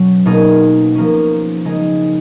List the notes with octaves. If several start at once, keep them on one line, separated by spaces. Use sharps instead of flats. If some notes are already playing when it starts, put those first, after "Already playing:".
Already playing: B2 F#3 C#4
B2 A#3 D#4 G#4
F3 A#3 C#4
C#3 G#3 D#4 G#4